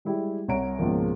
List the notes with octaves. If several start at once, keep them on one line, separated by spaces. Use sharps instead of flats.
G3 G#3 E4 G4
C2 C#5 F#5 A#5 D7
C#2 G#2 B2 F3 A#3